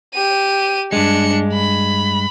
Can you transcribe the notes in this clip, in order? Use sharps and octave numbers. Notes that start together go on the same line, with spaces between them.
G4 D#7
G2 G#3 D4 C#7
B5